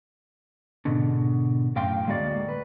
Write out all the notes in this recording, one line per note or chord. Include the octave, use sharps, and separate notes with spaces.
G#2 B2 D3
F#2 A2 F5 G5 C6
D2 G#3 A#3 F#4 D5
B4